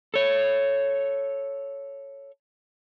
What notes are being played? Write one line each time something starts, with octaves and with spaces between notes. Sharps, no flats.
A4 C#5